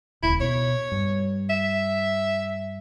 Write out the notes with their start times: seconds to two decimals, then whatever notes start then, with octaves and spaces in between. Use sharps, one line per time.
0.23 D#1 C#2 E4
0.41 B2 C#5
0.92 G2
1.50 E5